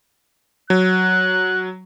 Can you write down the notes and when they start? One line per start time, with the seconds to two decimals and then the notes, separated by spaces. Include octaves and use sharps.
0.70 F#3 F#6